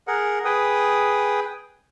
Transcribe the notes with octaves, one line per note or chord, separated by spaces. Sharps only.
G#4 A#4 F#5
G#4 B4 G5 D#6